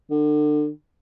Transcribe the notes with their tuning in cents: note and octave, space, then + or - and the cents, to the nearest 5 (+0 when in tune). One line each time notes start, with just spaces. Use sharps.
D3 +30